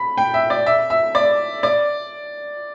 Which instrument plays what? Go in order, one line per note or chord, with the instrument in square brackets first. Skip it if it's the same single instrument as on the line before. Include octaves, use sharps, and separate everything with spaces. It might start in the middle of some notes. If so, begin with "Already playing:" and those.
Already playing: [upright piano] B5
G5
E5
D5
E5
E5
D5
D5